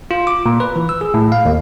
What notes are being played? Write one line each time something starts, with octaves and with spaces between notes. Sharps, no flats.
F4
D6
A#2
B4
E3
E6
G#4
A2
F5
D#2